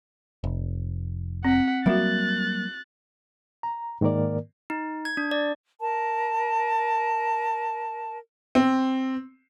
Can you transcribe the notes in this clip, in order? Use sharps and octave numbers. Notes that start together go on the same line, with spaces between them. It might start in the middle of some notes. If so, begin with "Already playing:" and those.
F1
C4 F#5 B6
F#3 G3 A#3 F#4 E5 F#6 A6
A#5
G#2 D#3 A#3 A#4 D5
D#4
G#6
D4
D5
A#4 A5
C4